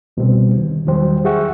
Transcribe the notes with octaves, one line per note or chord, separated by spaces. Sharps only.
C2 B2 D3 G3 B3 C4
D#3
E2 D#3 F#3 G3 C5 G5
G4 G#4 E5 F#5 G5 C#6